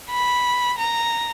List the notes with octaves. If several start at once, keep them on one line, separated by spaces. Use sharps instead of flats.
B5
A#5